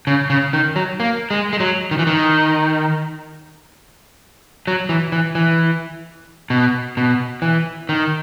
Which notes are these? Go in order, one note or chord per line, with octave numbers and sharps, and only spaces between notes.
C#3
C#3
D#3
F#3
A#3
G#3
G#3
F#3
D#3
E3
D#3
F#3
E3
E3
E3
B2
B2
E3
D#3